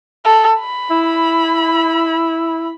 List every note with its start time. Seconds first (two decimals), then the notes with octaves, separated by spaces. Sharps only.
0.25 A4
0.60 B5
0.91 E4